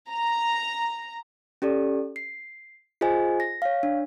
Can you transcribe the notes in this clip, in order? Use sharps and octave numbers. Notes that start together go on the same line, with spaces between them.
A#5
C#4 G4 A4 D5
C7
F4 G#4 C5 D#5 G#5
A#6
C#5 F5
D4